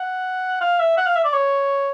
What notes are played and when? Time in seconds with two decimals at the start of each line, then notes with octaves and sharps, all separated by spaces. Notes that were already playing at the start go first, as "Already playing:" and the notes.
Already playing: F#5
0.61 F5
0.80 E5
0.97 F#5
1.06 F5
1.16 E5
1.25 D5
1.34 C#5